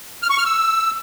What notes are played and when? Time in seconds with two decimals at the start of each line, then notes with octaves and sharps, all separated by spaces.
0.22 F6
0.30 C#6
0.38 F6
0.45 E6